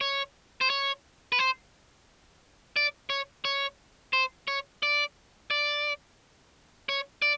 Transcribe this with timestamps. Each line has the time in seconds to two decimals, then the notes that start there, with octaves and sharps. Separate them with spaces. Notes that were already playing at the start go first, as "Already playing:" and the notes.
0.01 C#5
0.61 C5
0.70 C#5
1.32 B4
1.39 C5
2.76 D5
3.10 C#5
3.45 C#5
4.13 C5
4.48 C#5
4.83 D5
5.51 D5
6.89 C#5
7.22 D5